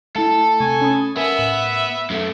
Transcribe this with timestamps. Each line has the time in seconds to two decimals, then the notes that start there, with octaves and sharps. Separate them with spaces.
0.16 A3 E4 A4
0.60 C3 A3 G#5 C#6
0.81 C#4 B5 D#6
1.17 B3 A#4 E5 G#5
1.39 A2
2.10 F#2 A3